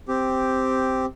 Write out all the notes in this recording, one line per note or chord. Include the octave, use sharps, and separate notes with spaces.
C4 G4